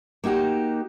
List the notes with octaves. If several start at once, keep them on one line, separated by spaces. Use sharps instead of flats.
A#3 D#4 F#4 G4